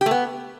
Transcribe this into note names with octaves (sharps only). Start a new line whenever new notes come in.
G4
A3
B3